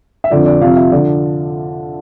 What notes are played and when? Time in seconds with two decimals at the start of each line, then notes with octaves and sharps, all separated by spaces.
0.24 E5
0.30 F2 D3 F3 D5
0.46 D5
0.61 F2 C3 F3 F5
0.77 E5
0.91 D3 F3 D5